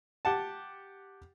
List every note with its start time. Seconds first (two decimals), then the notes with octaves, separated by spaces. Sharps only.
0.25 G4 F#5 A5